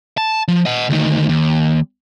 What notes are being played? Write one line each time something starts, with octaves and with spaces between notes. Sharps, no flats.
A5
F3
D#5 F#5
D2 D#3
D#2